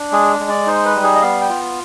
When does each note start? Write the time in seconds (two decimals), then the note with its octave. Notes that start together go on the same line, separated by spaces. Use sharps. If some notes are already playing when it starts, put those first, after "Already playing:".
Already playing: D4
0.12 G#3 G#4
0.40 G#3
0.50 D5
0.67 D#4 C5
0.85 B4
0.95 G3
1.04 G#4
1.16 D#5
1.22 B3 F5
1.41 G5
1.49 F4